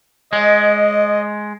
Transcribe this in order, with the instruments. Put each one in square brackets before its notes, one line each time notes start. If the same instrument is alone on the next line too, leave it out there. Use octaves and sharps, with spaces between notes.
[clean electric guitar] G#3 [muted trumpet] D#5